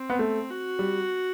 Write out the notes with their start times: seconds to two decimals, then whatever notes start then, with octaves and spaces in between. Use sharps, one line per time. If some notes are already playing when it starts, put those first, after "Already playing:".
Already playing: C4
0.10 B3
0.19 A3
0.50 F#4
0.79 G3